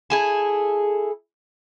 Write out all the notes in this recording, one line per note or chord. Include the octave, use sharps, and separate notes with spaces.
E4 G#4 A4